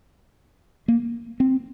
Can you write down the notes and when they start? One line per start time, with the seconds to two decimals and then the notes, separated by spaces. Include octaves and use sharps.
0.88 A#3
1.40 C4